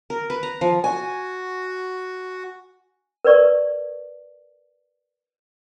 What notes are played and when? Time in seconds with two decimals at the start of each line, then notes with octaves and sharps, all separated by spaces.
0.10 A#4
0.30 B4
0.43 A#5
0.61 F3
0.84 F#4 G#5
3.25 A#4 B4 D5 C#6